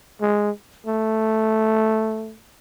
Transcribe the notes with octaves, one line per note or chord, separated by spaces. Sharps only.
G#3
A3